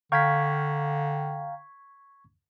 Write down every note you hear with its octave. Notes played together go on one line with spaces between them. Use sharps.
D3 F5 G5 A#5 C#6 G#6 B6